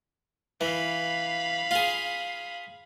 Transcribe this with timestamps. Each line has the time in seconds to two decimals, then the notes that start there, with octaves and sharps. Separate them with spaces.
0.61 E3 F5 B5
1.71 F4 G#4